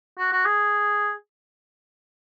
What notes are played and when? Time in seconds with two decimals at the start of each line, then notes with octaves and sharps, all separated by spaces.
0.18 F#4
0.32 F#4
0.45 G#4